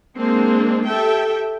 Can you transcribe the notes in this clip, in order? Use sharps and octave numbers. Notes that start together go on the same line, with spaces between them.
G#3 A#3 C4 D4
G4 A4 E5 G5